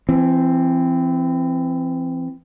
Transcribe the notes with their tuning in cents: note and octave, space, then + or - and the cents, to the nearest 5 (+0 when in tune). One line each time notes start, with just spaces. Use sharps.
E3 +35 C4 +0